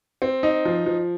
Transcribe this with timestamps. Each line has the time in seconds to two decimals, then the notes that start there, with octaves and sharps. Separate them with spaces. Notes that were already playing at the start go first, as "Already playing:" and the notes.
0.22 C4
0.43 D#4
0.65 F3
0.86 F3